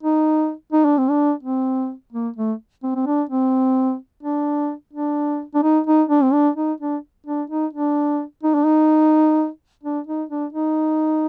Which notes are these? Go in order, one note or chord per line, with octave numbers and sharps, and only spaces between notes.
D#4
D#4
D4
C4
D4
C4
A#3
A3
C4
C4
D4
C4
D4
D4
D4
D#4
D#4
D4
C4
D4
D#4
D4
D4
D#4
D4
D#4
D4
D#4
D4
D#4
D4
D#4